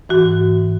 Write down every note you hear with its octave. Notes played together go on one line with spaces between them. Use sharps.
G#2 E3 F#4